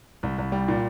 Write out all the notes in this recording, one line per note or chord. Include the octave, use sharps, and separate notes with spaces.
C2
C2
G3
A#2